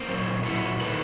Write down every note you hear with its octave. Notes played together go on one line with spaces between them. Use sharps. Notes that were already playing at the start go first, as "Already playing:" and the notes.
Already playing: A#3 C4
A#2 F#3
A#2 F#3 E4 F#4
C3 D#3 F#3 A4 B4